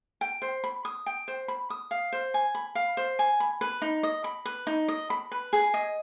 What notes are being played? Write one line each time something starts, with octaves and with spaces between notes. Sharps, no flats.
G5
C5
B5
D#6
G5
C5
B5
D#6
F5
C5
G#5
B5
F5
C5
G#5
B5
B4
D#4
D#5
B5
B4
D#4
D#5
B5
B4
G#4
D#5